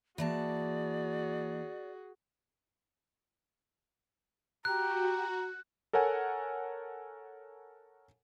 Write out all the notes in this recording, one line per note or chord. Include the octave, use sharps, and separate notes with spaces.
E3 A#3 F#4 G#4 D5 A5
F#4 G4 A#5 F#6
A4 A#4 C#5 F#5 G#5